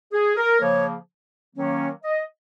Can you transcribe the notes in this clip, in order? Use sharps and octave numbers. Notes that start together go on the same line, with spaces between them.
G#4
A#4
C#3 F3 A#3 C#5
D#3 F#3 A#3 C#4
D#5